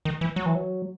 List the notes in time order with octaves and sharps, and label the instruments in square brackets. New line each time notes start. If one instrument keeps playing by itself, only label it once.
[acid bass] D#3
E3
F#3
E3
F#3